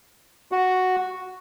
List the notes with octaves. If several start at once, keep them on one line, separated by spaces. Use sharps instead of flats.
F#4